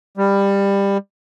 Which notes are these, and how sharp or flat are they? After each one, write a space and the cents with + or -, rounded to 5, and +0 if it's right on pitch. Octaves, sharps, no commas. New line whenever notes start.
G3 +20